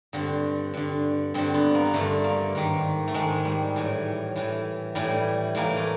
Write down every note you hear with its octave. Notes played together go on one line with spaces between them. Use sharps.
G2 D3 C4
G2 D3
G2 D3 C4
B3
A#3
A#3
G2 D3 A3
A#3
G#2 D#3
A3
G#2 D#3 G#3
G3
A2 E3
A2 E3
A2 E3 G3
A2 E3 A#3
A3